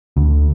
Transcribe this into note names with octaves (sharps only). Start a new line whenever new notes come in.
D2